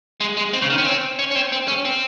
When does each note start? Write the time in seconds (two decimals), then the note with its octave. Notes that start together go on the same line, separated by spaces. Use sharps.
0.21 G#3
0.37 G#3
0.53 C4
0.62 C#3
0.70 D#3
0.78 C#4
0.86 C4
1.19 C#4
1.31 C#4
1.35 C4
1.52 C4
1.68 C#4
1.85 C4